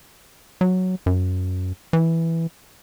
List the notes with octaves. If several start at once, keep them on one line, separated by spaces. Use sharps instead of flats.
F#3
F#2
E3